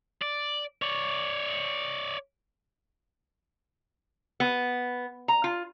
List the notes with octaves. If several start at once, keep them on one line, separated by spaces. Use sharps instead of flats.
D5
C#5 D5
B3
A#5
F4